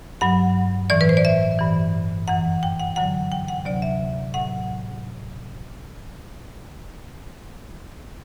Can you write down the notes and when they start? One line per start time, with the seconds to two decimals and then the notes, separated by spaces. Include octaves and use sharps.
0.21 G2 F#3 F#5
0.90 A2 E3 D5
1.01 B4
1.09 C5
1.17 D5
1.25 E5
1.59 G2 E3
2.28 F#2 E3 F#5
2.63 G5
2.80 F#5
2.96 F#2 D3 F#3 F#5
3.32 G5
3.48 F#5
3.65 D2 C3 F#3 D5
3.82 E5
4.34 A2 F#3 F#5